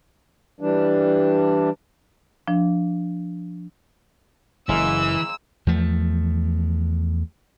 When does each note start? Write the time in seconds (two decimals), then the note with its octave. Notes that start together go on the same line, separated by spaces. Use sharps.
0.61 E3 G3 D4
2.47 F3 D4
4.69 F#1 E3 G#3 A#3 F5 E6
5.67 E2 F3 A3